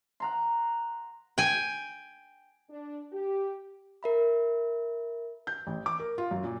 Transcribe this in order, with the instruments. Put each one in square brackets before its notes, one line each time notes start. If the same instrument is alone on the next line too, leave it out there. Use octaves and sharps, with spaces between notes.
[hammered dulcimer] F#5 A#5 C6
[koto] G5 G#5
[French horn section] D4
G4
[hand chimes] A#4 E5 B5
[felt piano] G6
A1
D6
A#4
F4
F#2
A#2